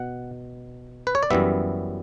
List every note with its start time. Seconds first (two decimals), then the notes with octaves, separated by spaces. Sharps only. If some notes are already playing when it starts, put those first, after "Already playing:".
Already playing: B2 F#5
1.07 B4
1.15 C#5
1.23 D5
1.30 F#2 E3 G3 B3 E5